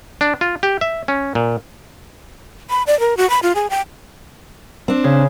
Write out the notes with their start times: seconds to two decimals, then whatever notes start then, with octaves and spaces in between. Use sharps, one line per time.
0.21 D4
0.41 F4
0.63 G4
0.81 E5
1.08 C#4
1.35 A#2
2.70 B5
2.87 D5
3.00 A#4
3.17 F#4
3.30 B5
3.43 F4
3.55 G#4
3.70 G5
4.88 C4 D4
5.04 C#3